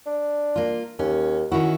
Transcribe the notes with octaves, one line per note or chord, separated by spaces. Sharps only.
D4
A#3 F4
D#2 C#4
D#3 C#4 E4 F#4